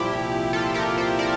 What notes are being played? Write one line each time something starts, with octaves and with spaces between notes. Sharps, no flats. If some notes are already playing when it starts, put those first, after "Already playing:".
Already playing: C2 A#2 F3 E4 G4
F4 A4
G4 A#4
A4 C5
A#4 D5